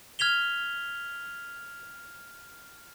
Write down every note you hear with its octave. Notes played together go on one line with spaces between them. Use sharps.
F6 G#6 B6 F7 G7